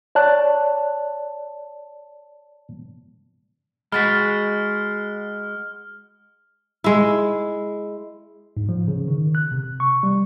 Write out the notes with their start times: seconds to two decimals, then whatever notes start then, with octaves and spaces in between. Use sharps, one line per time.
0.15 C#5 D5 A5 F#6
3.92 G#3 F#4 B5 F6 A6 B6
6.84 G#3 E4
8.57 G#2
8.69 F3
8.88 C#3
9.08 D#3
9.35 F#6
9.52 C3
9.80 C#6
10.03 G3